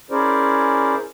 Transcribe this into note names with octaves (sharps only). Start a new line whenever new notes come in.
C#4 E4 G#4 A#4 C5 D5